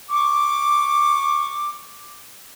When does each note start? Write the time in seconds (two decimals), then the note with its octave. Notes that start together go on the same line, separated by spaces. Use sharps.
0.11 C#6 D6